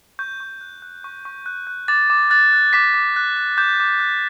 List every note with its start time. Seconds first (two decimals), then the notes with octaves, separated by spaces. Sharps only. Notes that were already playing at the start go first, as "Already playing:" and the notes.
0.19 C#6 G6
0.40 C#6
0.61 F#6
0.82 F#6
1.04 C#6
1.25 C#6
1.46 F#6
1.67 F#6
1.88 D6 A6
2.10 D6
2.30 F#6 A6
2.53 F#6
2.73 D6 B6
2.94 D6
3.16 F#6
3.37 F#6
3.58 D6 G6
3.80 D6
4.00 F#6